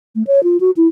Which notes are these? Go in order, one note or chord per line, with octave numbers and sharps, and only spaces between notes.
A3
C#5
F4
F#4
E4